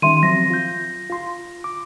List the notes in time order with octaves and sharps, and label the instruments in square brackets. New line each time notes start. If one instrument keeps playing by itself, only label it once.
[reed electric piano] D#3 G3 C#4 [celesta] E5 C6 D#7
[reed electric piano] F3 F#3 C4 [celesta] A#6
[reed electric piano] F4 G6
F4 C6
D6